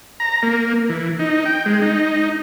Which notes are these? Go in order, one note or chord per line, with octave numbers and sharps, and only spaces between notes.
A#5
A#3
E3
D#4
G5
G#3
D#4